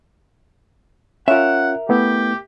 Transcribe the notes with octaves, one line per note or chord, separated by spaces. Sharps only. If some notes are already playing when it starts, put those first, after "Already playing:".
C#4 F4 A#4 E5 F#5
A3 B3 E4 G4